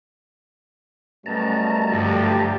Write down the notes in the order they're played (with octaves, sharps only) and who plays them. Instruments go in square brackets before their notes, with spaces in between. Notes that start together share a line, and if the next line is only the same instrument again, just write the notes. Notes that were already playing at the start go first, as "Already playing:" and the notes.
[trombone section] F#2 B2 [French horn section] F#3 G3 A3 [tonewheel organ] A5 A#5
[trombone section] D2 D3 F3 [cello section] G2 G4